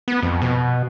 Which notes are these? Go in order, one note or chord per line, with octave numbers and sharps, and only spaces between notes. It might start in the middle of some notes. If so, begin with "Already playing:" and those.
B3
F2
B2